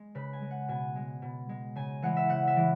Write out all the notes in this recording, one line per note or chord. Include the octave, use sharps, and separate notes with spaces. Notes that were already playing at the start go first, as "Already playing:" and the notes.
Already playing: G#3
C#3 B4
G#5
G#3
F#5
B2 G#5
G#3
B2
G#3
C#3 G#5
E3 G#3 F#5
E5
C#3 F#5
E5
E3 G#3